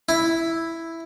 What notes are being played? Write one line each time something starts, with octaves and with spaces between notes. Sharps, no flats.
E4